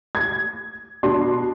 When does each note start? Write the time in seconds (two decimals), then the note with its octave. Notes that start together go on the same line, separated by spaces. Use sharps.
0.15 G#6
1.03 B2 D4 C6